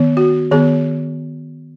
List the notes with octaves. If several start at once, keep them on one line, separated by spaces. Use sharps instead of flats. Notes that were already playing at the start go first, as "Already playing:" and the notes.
Already playing: D#3 B3
F#4
D#3 B3 G#4